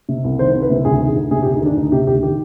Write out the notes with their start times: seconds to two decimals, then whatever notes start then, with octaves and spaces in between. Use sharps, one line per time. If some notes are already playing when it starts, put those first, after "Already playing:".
0.09 C3
0.24 C2
0.39 D#3 C5
0.55 C2
0.62 B4
0.70 C3
0.85 D2 G#4
1.00 D#3
1.08 G#4
1.16 D2
1.31 C3 G#4
1.43 G4
1.46 D2
1.54 D#4
1.62 D#3 D4
1.76 D2 D#4
1.92 C3 G4
2.07 D2 G4
2.23 D#3 G4